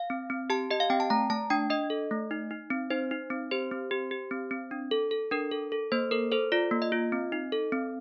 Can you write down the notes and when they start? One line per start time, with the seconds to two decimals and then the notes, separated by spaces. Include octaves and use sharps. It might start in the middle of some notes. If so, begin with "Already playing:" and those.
Already playing: F5
0.10 C4
0.30 C4
0.50 G4 A5
0.70 G4 D#5
0.80 F5
0.90 C4 G5
1.00 A5
1.10 A3 A#5
1.30 A3 A5
1.50 D4 G5
1.70 D4 D#5
1.90 A4
2.11 A3
2.31 D#4
2.51 D#4
2.70 C4
2.90 D#4 C5
3.11 D#4
3.30 C4
3.51 G4 C5
3.71 C4
3.91 G4
4.11 G4
4.31 C4
4.51 C4
4.71 D4
4.91 A4
5.11 A4
5.31 D4 A#4
5.51 A4
5.72 A4
5.92 A#3 C5
6.11 A4 A#4
6.32 A4 C5
6.52 F4 D5
6.71 A#3
6.82 D#5
6.92 F4
7.12 C4
7.32 D#4
7.52 A4
7.72 C4